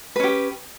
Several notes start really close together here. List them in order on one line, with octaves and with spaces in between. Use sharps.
B4 C#4 G4